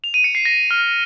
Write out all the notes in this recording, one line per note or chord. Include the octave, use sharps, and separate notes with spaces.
F7
D#7
C#7
C7
A#6
F6